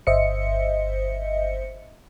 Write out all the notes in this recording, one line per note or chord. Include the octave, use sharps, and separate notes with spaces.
G1 C5 D#5 E5 C#7